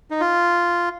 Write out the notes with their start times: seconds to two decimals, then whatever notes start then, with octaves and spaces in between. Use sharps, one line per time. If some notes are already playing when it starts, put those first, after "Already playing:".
0.11 D#4
0.20 F4